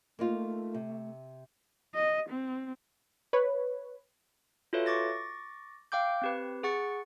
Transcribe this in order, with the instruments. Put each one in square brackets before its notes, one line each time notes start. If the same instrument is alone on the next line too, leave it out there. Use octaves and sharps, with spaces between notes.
[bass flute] A3 [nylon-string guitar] A#3 D#4 F4
[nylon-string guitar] C3
[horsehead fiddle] D#5
C4
[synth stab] B4 C#5
[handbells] F4 F#4 A4 B4 C#5 E5
C#6 D6 A6 A#6
F5 G5 D6 G6
C4 G4 B4
G#4 F#5 C#6 A6 C#7